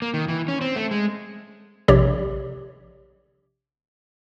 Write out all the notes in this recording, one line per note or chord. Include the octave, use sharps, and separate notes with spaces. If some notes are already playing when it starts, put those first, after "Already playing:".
A#3
D#3
E3
C#4
C4
A3
G#3
A#1 C3 G4 C#5 D5